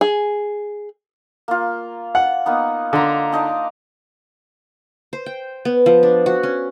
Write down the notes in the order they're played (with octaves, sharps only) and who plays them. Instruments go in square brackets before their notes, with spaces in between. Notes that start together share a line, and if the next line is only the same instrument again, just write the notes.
[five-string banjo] G#4
[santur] A#3 F4
[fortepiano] F#5
[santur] A#3 B3 D#4
[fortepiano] D3 [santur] A#5 C6
[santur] D4 D#4 D5
[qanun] C5
G5
B3
F3
D4
F#4
C#4